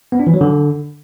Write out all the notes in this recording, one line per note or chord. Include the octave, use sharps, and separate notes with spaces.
B3
D4
E3
F#3
D3